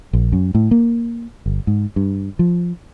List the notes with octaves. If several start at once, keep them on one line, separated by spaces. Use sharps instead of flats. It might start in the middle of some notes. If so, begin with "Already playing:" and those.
A#1
F#2
A2
A#3
G1
G#2
G2
F3